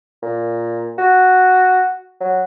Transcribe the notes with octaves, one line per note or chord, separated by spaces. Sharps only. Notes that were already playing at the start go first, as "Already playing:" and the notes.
A#2
F#4
F#3